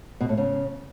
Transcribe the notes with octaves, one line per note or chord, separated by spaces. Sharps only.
B2
A2
C#3